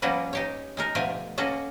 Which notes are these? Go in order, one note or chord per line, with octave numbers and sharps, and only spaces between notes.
F3 G3 A#3 B3 C#4 F#4
D#4 G4 C#5
G#3 D#4 A#4
B2 D3 F3 A3 G4 G#5
A#3 C#4 F#4 A4 D#5